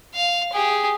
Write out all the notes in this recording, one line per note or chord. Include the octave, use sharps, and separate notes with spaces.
F5
G4 G#4